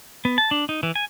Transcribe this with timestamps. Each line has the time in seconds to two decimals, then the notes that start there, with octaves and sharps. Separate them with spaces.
0.25 B3
0.38 A5
0.51 D4
0.69 D#4
0.83 E3
0.96 G#5